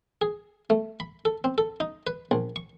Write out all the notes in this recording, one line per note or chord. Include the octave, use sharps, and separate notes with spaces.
G#4
A3
B5
A4
C4
A4
D#4
B4
A#1
C#6